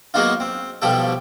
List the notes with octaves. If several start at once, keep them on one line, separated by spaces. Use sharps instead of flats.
F#3 G#3 A#3 B3 D#4 F4
C4
B1 B2 F3 G3 A4 G5